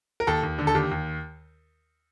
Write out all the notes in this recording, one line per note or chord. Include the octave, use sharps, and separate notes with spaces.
A#4
D#2 A4
D#2
D3
A4
D#2 G4
D#2